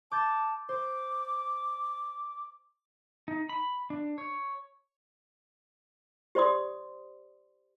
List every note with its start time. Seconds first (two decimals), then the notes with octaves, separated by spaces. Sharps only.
0.12 A5 D6 G6 A6
0.69 C5 D6
3.28 D#4
3.49 B5
3.90 D4
4.18 C#5
6.35 G4 C5 D5 C6 D#6